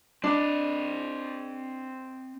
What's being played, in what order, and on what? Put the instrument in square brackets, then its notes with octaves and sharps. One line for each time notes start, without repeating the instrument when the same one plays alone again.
[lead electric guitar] C4 D#5 [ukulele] D4